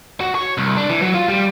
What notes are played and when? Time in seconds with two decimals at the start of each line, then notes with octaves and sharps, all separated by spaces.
0.21 F#4
0.35 C#5
0.58 C2
0.77 D4
0.90 E3
1.02 F#3
1.14 F4
1.28 G3